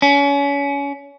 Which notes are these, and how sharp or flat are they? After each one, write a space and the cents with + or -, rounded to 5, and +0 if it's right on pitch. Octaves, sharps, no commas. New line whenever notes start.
C#4 +30